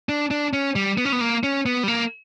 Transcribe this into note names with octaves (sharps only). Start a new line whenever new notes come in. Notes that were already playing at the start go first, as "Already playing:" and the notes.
D4
D4
C#4
G3
B3
C#4
B3
A#3
C#4
B3
G3
A#3